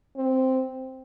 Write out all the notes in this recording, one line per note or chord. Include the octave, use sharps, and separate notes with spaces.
C4